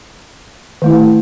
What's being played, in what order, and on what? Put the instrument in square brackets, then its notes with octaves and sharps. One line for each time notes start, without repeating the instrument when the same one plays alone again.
[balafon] D#3 A3 E4